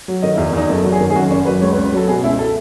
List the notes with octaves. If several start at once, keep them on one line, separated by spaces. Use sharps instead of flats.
F#3
D#3 D#5
E4
E2
E2 D#4
F#1 A4
F#3
G#4
D#3
G#4
F#2 F#4
F#1 C#4
F#3 B4
C#2 C#5
B4
C#2
B4
F#3 A4
B2 G#4
C#2 E4
A4